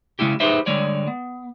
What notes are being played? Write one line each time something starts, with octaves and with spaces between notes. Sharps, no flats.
C#3 G#3 C#4 E4 G4
D#4 G4 G#4 B4 C5 E5
D3 G3 G#3 C#5 D5
B3